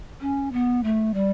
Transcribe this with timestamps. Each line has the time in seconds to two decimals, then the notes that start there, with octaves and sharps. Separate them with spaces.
0.21 C#4
0.52 B3
0.84 A3
1.14 G3